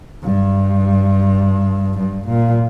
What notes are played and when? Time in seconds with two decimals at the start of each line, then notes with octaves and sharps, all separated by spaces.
0.24 G2
1.99 G2
2.28 A#2